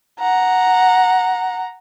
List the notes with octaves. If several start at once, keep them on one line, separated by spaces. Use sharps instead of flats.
F#5 A#5